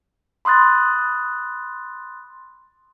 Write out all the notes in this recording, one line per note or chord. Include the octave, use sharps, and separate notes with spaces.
B5 C6 D#6 F#6 A6